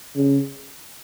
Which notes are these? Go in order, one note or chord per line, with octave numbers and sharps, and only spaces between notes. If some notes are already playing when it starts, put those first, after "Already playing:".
C#3